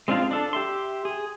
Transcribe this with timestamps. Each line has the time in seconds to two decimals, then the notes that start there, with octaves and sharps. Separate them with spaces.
0.08 G#3 C4 D4 F4 F5
0.31 D4 A4
0.53 G4 E5 C6
1.05 G#4